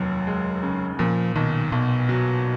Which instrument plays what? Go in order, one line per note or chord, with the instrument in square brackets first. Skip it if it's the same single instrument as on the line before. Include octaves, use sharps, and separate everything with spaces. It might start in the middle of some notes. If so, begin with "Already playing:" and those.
Already playing: [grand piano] F1 D#2 [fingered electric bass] F#3
[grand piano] G#3
C#3
[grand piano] A#2 [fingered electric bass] F3
[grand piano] B1 [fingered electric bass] D#3
[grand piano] B1 [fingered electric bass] B2
[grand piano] F#3